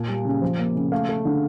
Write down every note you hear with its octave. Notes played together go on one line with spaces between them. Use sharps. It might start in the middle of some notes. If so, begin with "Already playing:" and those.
Already playing: A#2 A#3 A5
G3
C#3
F3
A#3
C#3
A3 F5
A3
D3